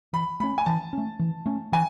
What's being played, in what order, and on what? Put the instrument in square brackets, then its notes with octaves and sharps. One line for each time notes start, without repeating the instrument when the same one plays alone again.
[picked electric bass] E3 [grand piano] B5
[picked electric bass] A3 C#4 [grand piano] B5
[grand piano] G#5
[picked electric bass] E3 [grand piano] A5
[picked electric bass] A3 C#4
E3
A3 C#4
[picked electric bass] E3 [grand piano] G#5